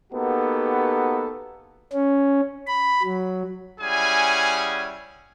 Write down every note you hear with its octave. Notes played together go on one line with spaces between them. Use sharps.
A#3 B3 D#4 F#4 G4 A4
C#4
B5
F#3
G3 C#4 E4 G#4 F#5 G#5